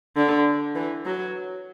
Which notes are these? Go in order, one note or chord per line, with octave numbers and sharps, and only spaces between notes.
D3
E3
F#3